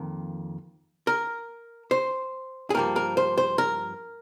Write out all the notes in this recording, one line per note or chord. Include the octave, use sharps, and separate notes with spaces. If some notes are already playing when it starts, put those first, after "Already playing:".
Already playing: F2 D#3 A#3
A#4
C5
G#4
G2 F3 A#3 A#4
A#4
C5
C5
A#4